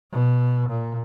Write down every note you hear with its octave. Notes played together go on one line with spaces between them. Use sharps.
B2
A#2